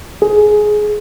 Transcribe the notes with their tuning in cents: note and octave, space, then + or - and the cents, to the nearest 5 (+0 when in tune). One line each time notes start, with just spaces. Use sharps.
G#4 +15